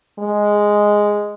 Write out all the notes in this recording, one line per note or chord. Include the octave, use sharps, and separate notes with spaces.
G#3